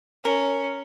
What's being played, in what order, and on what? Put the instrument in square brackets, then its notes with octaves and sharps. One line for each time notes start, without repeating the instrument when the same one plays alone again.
[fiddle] C#4 [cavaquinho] A#4